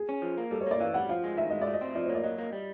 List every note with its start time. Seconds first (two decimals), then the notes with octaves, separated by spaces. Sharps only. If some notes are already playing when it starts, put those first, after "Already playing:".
Already playing: G#4
0.09 C#4
0.22 F3
0.38 A#3
0.51 G3 A4
0.61 C#5
0.66 A#3 D5
0.80 E3 F5
0.94 G3 F#5
1.09 F3 F5
1.24 G#3
1.37 D#3 E5
1.50 G#3 D#5
1.62 D5
1.67 A3
1.74 D#5
1.81 C4
1.95 F3 D5
2.05 C#5
2.10 A#3
2.15 D5
2.24 F#3 D#5
2.38 A#3
2.52 G3